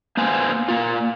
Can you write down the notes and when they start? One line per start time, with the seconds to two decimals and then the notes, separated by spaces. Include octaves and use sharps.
0.17 A#3 B3 C5 G#5
0.68 A#3 F4